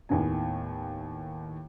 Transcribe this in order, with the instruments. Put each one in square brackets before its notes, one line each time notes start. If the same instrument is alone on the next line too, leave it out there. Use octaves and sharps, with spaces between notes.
[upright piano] D#2 A2 D#3 B3 G#5